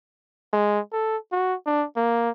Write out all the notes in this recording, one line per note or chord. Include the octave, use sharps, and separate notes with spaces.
G#3
A4
F#4
D4
A#3